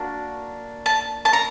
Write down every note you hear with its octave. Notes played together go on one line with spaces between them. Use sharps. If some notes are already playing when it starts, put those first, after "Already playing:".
Already playing: A#3 D4 F#4
A5
A5
A#5